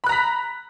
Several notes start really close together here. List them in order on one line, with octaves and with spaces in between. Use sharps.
B5 F#6 A#5 B6